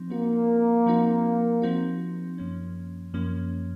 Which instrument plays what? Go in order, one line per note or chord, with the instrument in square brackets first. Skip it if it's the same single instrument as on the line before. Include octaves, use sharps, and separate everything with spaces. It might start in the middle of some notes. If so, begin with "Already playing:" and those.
Already playing: [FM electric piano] F3 C4 D#4
[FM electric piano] F3 C4 D#4 F#4 [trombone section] A#3
[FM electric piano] F3 C4 D#4 F#4
F3 C4 D#4 F#4
F#2 F3 A#3 C#4
F#2 F3 A#3 C#4